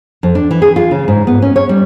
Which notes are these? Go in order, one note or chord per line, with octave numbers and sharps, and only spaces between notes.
F2
D4
E3
G#4
F4
C#3
G#2
B3
C#4
C#5
G3